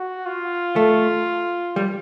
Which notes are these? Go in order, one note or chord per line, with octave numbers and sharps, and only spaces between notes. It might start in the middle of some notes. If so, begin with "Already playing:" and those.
Already playing: F#4
F4
A3
G3